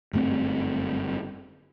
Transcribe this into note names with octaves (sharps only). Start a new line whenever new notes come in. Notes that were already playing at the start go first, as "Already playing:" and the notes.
G1 F#2 A3 C4